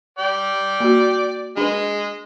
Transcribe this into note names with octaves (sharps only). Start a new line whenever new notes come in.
D5 G5
A#3 F#4
G#3 D4 B4